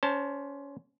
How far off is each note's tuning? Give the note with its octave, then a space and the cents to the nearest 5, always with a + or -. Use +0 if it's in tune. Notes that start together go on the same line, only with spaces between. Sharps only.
C#4 +25 C5 +0 A5 +15